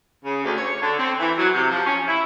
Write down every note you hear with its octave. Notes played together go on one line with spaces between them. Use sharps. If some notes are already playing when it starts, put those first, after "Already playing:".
C#3
D2
C#5
D3
C4
E3
F#3
C3
F3
C#4
E4